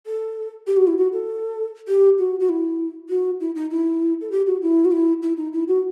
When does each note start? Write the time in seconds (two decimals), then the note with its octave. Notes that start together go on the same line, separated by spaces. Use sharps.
0.07 A4
0.67 G4
0.77 F#4
0.87 E4
0.98 F#4
1.13 A4
1.88 G4
2.19 F#4
2.40 F#4
2.49 E4
3.09 F#4
3.40 E4
3.55 D#4
3.71 E4
4.21 A4
4.31 G4
4.47 F#4
4.62 E4
4.85 F#4
4.92 E4
5.22 E4
5.37 D#4
5.53 E4
5.68 F#4